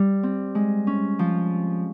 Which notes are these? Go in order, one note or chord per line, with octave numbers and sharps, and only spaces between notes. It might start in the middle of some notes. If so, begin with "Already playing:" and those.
Already playing: G3
C4
G#3
C#4
F3